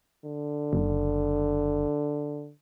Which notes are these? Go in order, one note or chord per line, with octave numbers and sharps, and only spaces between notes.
D3
F#1